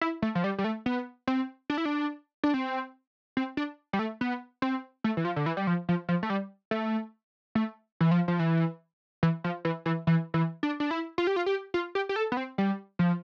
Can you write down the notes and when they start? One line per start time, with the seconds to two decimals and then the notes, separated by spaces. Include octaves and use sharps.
0.01 E4
0.22 A3
0.35 F3
0.44 G3
0.58 G3
0.64 A3
0.86 B3
1.28 C4
1.70 D4
1.78 E4
1.85 D4
2.44 D4
2.54 C4
3.37 C4
3.57 D4
3.93 G3
3.99 A3
4.21 B3
4.62 C4
5.04 A3
5.17 E3
5.25 F3
5.36 D3
5.46 E3
5.57 G3
5.67 F3
5.89 F3
6.09 F3
6.23 A3
6.30 G3
6.71 A3
7.55 A3
8.01 E3
8.11 F3
8.28 F3
8.39 E3
9.23 E3
9.44 F3
9.65 E3
9.86 E3
10.07 E3
10.34 E3
10.63 D4
10.80 D4
10.91 E4
11.18 F4
11.27 G4
11.36 F4
11.46 G4
11.74 F4
11.95 G4
12.09 G4
12.16 A4
12.32 B3
12.37 C4
12.58 G3
12.99 F3